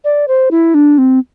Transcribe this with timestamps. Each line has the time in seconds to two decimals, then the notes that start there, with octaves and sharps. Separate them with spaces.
0.04 D5
0.28 C5
0.51 E4
0.74 D4
0.98 C4